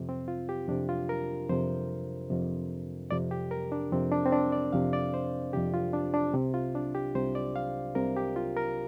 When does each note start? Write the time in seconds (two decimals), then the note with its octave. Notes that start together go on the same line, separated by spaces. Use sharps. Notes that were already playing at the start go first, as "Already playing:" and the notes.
Already playing: F2 C3
0.09 C4
0.28 F4
0.49 G4
0.68 F2 C3 D4
0.89 F4
1.09 A#4
1.49 F2 C3 C5
2.30 F2 C3
3.11 F2 C3 D5
3.31 G4
3.51 A#4
3.72 D4
3.92 F2 C3 C4
4.12 D4
4.26 C4
4.32 D4
4.52 D5
4.73 F2 C3 F5
4.93 D5
5.14 C5
5.53 F2 C3 G4
5.74 F4
5.93 D4
6.14 D4
6.34 C2 C3
6.54 F4
6.75 D4
6.95 G4
7.15 C2 C3 C5
7.35 D5
7.56 F5
7.95 C2 C3 A#4
8.17 G4
8.36 F4
8.57 A#4